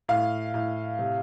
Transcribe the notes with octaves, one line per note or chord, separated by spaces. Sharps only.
A2 F5
A2
C3